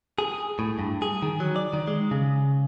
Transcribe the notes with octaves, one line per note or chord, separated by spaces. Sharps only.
G#4
A2
G2
G#4
D#3
F#3
D5
D#3
G#3
C#3